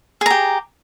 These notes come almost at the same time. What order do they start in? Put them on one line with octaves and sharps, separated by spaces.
G#4 A#5 G4